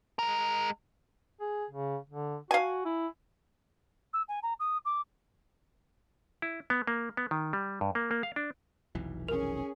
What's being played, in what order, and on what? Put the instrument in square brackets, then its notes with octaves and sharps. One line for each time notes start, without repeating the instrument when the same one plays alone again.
[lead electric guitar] G#3 A#4
[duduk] G#4
C#3
D3
[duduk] F#4 [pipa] F5 G#5
[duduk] E4
[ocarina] E6
G#5
A#5
D#6
D6
[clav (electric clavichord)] E4
B3
A#3
B3
D#3
G3
G2
A#3
A#3
F5
D4
[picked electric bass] F1 B1 E3
[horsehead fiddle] C#4 G#4 [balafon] A#4